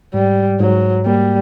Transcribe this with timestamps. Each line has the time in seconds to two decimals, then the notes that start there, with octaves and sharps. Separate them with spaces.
0.14 G#2 G3
0.60 G#2 F#3
1.06 G3 A#3